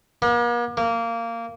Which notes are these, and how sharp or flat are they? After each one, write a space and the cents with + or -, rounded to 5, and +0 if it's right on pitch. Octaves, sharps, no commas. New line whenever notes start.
A#3 +45
A#3 -15